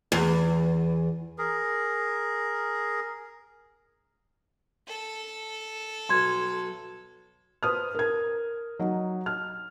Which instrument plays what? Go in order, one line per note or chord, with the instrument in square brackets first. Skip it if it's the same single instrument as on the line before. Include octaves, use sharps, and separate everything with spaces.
[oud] E2
[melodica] G#4 A#4
[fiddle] A4
[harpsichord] B1 [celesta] C6 G#6
[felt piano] B4 C5 D#6 F6
A#4 G#6
F#3 D#4
F6